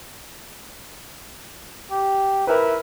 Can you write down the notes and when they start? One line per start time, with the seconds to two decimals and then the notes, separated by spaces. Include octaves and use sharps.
1.91 G4
2.47 E4 A#4 B4